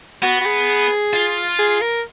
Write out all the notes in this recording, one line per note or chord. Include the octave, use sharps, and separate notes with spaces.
B3 F#4
F#4
G#4
F4
G#4
A#4